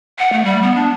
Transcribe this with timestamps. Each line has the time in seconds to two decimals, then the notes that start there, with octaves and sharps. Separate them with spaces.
0.19 F#5
0.33 A3
0.45 G3
0.62 B3
0.76 D4